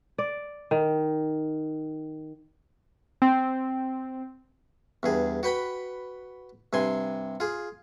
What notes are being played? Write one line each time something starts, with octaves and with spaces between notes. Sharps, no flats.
D5
D#3
C4
E2 G2 G#4
F#4 B4 G5 B5
G2 C3 G#5 C6
F4 G#4